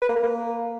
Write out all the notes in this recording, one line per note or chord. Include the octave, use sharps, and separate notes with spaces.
B4
A#3
A#4
A#3